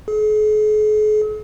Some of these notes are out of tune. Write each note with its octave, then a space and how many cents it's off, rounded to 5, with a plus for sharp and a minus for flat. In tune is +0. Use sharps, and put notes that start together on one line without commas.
G#4 +45